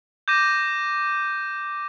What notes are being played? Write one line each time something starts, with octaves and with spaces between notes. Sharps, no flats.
D6 G6 A#6 D#7